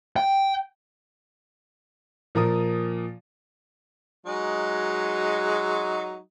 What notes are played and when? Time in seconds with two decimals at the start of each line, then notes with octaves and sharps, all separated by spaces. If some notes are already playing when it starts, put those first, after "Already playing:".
0.16 G5
2.35 A#2 F3 A#4 D#6
4.26 F#3 G#3 D#4